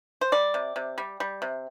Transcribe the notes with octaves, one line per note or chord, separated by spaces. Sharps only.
C5
G3 D5
C3
C3
G3
G3
C3